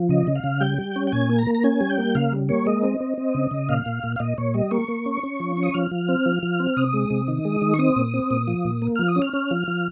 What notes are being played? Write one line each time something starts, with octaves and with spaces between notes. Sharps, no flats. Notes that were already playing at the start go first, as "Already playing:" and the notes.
Already playing: F3
C#3 D#5
C#3
F5
C#3
G3 G5
G3
C#4
G5
A#2 G#5
A#3
A#5
A#3
A#5
C#4 G#5
G3
G5
A#3
C#3 F5
G3
A#3 C#5
G#3 D#5
C4
C4
C4
C#3
C#3
A#2 F5
A#2
A#2
F5
A#2 D#5
A#2 C#5
G3 D#5
A#3 C#6
A#3
C#4
C#4
F3
C#4
D#6
F3 F6
F3
C4
F3
F3
C4
C3 D#6
G#3
C3
D#3
G#3
D#3
C#6
C4 D#6
A#2
C4
A#2
F3
A#2
A#3
F3 F6
D#6
C#4
F6
C#4
F3
F3